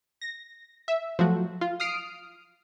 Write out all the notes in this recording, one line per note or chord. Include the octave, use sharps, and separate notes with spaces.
A#6
E5
F3 F#3 A3 F#4
F4
D#6 F6 C7 D7